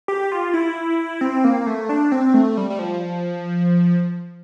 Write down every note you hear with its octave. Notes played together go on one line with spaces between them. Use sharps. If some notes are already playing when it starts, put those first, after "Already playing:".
G4
F4
E4
C4
A#3
A3
D4
C4
A3
G3
G3
F3